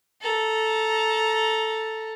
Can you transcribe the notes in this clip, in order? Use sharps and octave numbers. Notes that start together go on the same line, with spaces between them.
A4 A#5